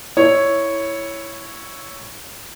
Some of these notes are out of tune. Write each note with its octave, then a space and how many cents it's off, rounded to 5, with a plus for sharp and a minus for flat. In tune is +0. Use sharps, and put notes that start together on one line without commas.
E4 +0 C#5 +0